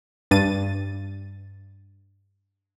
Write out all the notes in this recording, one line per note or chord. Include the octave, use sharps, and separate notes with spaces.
G2 A6 D#7